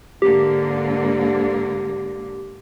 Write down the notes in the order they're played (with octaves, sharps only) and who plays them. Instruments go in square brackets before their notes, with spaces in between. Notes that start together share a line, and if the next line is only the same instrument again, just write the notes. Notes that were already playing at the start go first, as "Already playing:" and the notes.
[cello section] G#2 D3 A#3 [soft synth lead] G4